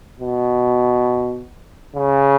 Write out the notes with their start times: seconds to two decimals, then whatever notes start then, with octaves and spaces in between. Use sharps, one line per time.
0.20 B2
1.96 C#3